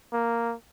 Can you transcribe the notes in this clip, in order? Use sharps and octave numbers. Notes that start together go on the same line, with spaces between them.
A#3